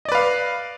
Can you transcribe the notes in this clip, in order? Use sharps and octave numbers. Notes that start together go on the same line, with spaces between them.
B4 D5 D#5 F5